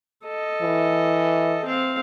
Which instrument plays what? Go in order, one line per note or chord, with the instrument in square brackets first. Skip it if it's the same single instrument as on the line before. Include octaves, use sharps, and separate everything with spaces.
[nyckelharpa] A4 D#5
[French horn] E3
[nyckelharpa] C4 F5